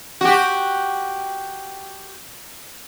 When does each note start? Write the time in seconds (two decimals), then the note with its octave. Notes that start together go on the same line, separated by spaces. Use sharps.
0.21 F#4 G4